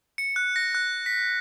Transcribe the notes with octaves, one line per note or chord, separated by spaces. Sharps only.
C#7
F#6
A#6
F#6
B6